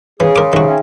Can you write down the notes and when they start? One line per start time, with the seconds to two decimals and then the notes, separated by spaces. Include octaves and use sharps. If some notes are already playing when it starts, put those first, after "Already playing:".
0.20 C#3 E3 G#4
0.36 A#4 G#5 C6 D6 D#6
0.53 C3 D#3 F#3 D#4 F#4 G#4 E5
0.68 C#4 E5 G5